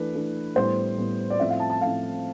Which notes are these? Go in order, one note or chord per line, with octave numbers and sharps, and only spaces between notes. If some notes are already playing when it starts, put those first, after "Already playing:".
Already playing: E3 A3 D4 B4
E3 A3 D4
A2 G3 B3 C5
A2 G3 B3
D5
A2 F3 A3 C4 E5
F5
A5
A5
A2 F3 A3 C4 F5